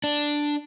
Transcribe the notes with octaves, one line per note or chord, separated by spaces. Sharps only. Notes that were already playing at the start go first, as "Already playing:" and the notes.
D4